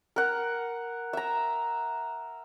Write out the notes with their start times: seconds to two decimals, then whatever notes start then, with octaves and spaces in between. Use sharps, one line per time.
0.16 A#4 F#5
1.13 E5 A#5